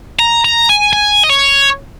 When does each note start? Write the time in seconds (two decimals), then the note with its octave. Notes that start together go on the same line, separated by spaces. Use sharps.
0.19 A#5
0.45 A#5
0.69 G#5
0.93 G#5
1.24 D#5
1.30 C#5